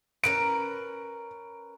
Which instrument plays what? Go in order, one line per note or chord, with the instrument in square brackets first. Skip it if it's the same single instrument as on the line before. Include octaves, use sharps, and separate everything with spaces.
[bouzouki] C#4 A#4 B4 [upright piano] D7